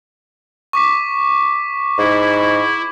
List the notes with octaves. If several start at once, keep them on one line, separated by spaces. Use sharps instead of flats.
C#6 D6 B6
G#2 E4